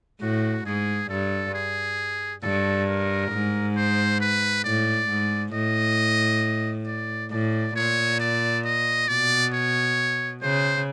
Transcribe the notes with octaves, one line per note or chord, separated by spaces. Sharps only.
A2 F#4
G#2 G#4
G2 A4
G#4
G2 A4
A#4
G#2
C5
B4
A2 D5
G#2
A2 D#5
D5
A2 D5
A#2 C#5
D5
D#5
B2 D5
C#5
C#3 C5